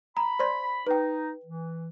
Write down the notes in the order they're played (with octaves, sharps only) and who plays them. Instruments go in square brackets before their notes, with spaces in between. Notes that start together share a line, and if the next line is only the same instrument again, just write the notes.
[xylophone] A#5 [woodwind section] B5
[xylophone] C5 D5 C6
[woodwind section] D#4 [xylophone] B4 G5
[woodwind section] E3